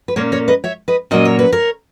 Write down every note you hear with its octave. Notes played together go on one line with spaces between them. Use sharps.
B4
A#2 A#3 C#4 A#4 C#5
A#4 C#5
B4 D#5
C#5 E5
B4 D#5
A#2 F#3 A#3 C#4 D#5
C#5
B4
A#4 C#5